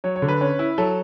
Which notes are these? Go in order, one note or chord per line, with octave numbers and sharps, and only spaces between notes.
F#3 C#5
C#5
D3
B4
C#4
E4
F#3 A4